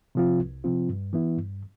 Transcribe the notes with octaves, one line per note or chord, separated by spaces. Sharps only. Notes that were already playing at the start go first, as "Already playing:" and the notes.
C3 F3 C4 F4
C2
C3 F3 C4 F4
G2
E3 B3 E4
G2